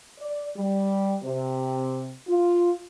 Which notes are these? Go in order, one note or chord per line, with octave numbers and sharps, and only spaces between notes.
D5
G3
C3
F4